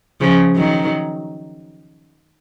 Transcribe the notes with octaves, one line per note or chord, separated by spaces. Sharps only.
C#3 F3
D#3 F#3